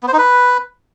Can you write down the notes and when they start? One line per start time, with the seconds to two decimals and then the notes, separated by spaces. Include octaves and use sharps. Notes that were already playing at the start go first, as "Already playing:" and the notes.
0.03 B3
0.08 C5
0.13 D#4
0.18 B4